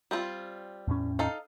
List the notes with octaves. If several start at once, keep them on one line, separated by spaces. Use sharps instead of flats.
G3 C4 F4
E2 A2 C#4
D#4 A4 F5